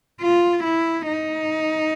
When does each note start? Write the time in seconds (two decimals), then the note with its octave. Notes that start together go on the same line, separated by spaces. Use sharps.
0.21 F4
0.64 E4
1.07 D#4